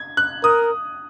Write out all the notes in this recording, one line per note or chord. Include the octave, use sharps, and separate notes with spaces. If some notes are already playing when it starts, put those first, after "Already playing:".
Already playing: G#6
F#6
A#4 D#6